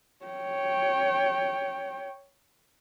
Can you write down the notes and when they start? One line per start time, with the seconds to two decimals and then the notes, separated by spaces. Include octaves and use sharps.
0.25 C#5 G5